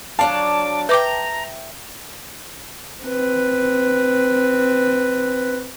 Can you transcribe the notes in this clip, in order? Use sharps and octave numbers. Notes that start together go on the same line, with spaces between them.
F#3 D4 F5 A5 D6
B4 E5 G5 A#5 D6
C4 B4